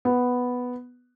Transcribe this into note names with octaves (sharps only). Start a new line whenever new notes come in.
B3